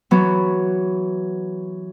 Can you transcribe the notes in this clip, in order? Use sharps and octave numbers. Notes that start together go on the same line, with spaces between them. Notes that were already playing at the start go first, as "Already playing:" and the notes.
E3 F#3 B3